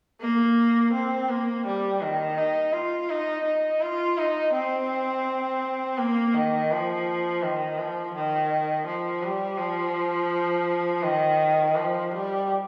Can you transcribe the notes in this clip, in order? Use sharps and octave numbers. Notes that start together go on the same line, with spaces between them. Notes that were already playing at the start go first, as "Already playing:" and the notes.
A#3
C4
A#3
G3
D#3
D#4
F4
D#4
D#4
F4
D#4
C4
A#3
D#3
F3
D#3
F3
D#3
F3
G3
F3
D#3
F3
G3